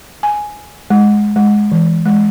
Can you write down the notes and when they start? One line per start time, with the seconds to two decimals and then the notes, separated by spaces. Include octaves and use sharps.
0.23 G#5
0.90 G#3
1.36 G#3
1.72 E3
2.06 G#3